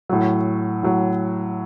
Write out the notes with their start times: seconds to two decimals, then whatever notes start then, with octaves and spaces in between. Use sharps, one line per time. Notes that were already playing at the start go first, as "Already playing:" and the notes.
0.09 A2 F#3
0.83 A2 F#3